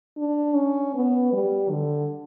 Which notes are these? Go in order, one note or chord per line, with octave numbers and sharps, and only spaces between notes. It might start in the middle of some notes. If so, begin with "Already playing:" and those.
D4
C#4
B3
G3
D3